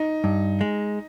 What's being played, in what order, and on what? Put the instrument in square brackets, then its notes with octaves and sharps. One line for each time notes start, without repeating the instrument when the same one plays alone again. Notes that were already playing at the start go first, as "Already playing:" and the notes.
Already playing: [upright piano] D#4
[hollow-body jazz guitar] G2
G#3